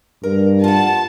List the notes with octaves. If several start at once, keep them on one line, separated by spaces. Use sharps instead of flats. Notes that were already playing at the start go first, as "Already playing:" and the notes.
G2 A#4
F4 F#5 A5